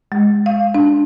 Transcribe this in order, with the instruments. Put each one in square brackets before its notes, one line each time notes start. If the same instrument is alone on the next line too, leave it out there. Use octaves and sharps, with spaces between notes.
[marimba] G#3
F5
D4